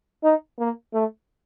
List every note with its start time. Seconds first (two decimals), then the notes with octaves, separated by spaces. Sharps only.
0.24 D#4
0.59 A#3
0.94 A3